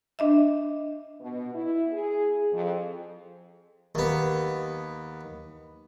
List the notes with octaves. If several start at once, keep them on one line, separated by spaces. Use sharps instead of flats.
D4 D#5 E5
B2
E4
G#4
F2
D#2 B3